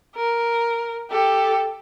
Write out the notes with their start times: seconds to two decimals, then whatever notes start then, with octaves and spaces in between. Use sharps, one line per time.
0.15 A#4
1.11 G4 A4